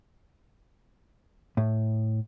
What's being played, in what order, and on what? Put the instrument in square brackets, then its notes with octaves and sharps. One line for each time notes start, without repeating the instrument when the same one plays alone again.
[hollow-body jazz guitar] A2